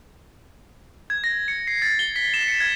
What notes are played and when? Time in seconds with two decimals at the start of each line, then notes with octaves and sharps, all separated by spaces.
1.10 G#6
1.24 A#6
1.48 C#7
1.67 C7
1.82 A6
1.99 G7
2.16 B6
2.34 E7
2.48 C#7
2.60 G#6